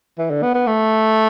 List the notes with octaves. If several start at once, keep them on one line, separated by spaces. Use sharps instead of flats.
E3
D3
B3
B3
A3